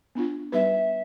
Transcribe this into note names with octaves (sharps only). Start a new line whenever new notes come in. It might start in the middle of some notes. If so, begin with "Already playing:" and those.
B3 D4 F4
G3 B3 D#4 G4 B4 E5